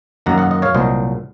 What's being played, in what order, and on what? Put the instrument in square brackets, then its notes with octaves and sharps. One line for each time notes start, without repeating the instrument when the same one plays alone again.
[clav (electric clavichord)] F#2 D#3 A#3 F#5 A#5
D#5 F#5
D#5 F#5
C#5 F5
C2 A#2 F#3 C5 D#5